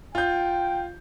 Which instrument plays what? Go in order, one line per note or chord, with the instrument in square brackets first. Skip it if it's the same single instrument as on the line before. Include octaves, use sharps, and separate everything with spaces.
[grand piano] F4 G6 [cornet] G5